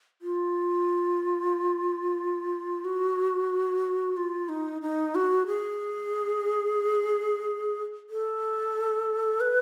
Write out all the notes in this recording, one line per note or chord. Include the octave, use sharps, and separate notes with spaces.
F4
F#4
F4
D#4
D#4
F#4
G#4
A4
B4